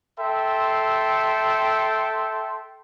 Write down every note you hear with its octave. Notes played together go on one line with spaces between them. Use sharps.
A4 E5 G5 C6